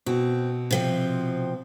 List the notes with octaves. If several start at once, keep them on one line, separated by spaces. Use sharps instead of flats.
B2 C4
C3 F3 C4